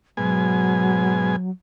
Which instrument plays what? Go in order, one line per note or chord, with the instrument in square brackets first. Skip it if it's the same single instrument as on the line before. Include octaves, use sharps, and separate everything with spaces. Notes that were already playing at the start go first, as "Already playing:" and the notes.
[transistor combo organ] G#2 B2 G#5 [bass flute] F#3